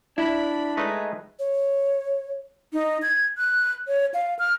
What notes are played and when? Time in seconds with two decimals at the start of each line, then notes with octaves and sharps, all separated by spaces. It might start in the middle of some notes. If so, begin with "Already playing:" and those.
0.18 D4 E4 B5
0.77 G#3 A3 D#4 B4
1.39 C#5
2.73 D#4
3.02 G#6
3.38 F#6
3.88 C#5
4.14 F5
4.39 F6